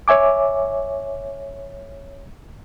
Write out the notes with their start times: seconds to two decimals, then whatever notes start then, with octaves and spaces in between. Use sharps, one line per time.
0.08 C#5 E5 G#5 D6